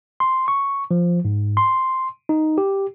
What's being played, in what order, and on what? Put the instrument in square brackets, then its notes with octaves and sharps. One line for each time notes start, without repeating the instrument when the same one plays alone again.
[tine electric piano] C6
C#6
F3
G#2
C6
D#4
G4